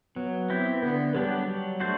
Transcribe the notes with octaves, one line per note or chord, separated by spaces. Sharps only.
F#3 B3
C4 E4 G4
D3 B3
F#3 G3 B3 D4 G4
F#3
A3 D4 F#4 C5